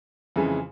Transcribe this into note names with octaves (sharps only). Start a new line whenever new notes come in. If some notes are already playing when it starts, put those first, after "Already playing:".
F2 C#3 E3 G#3